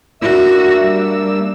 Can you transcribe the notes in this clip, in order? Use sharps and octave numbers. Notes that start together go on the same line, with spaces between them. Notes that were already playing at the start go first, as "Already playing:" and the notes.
A#3 D4 F#4 E5 E6
G3